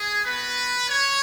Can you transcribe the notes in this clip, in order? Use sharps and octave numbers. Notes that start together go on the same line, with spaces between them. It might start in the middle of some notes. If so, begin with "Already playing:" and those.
Already playing: G#4
B3 F#4 B4
C#5